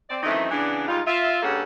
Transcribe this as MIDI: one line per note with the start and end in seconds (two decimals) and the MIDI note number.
0.10 0.20 60
0.10 0.20 74
0.23 0.48 42
0.23 0.48 51
0.23 0.48 52
0.23 0.48 57
0.23 0.48 60
0.23 0.48 63
0.51 0.85 49
0.51 0.85 52
0.51 0.85 59
0.51 0.85 62
0.88 1.00 44
0.88 1.00 55
0.88 1.00 63
0.88 1.00 65
1.07 1.42 65
1.07 1.42 76
1.43 1.63 43
1.43 1.63 58
1.43 1.63 61
1.43 1.63 68
1.43 1.63 69
1.43 1.63 78